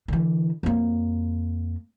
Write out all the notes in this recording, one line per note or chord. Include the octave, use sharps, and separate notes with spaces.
D3 E3
F2 A#3